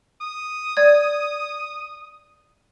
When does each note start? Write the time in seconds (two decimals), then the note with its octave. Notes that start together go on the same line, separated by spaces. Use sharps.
0.21 D#6
0.77 D5 G#6